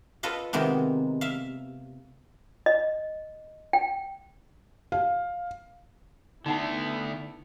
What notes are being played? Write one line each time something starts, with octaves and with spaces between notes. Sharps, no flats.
F4 A4 B4 D#5 F5
C3 D#3 G#3 A#3 B3
E5 F5
D#5
G5
F5
D3 A3 B3 D#4 E4 F#5 A5